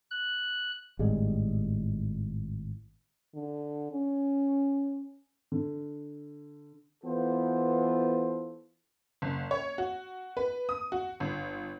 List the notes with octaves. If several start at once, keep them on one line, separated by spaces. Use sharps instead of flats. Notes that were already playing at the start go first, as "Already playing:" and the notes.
F#6
G#1 A2 G3 G#3
D3
C#4
D3
E3 B3 F4 A4 C5
F#1
C#5
F#4
B4
D#6
F#4
G1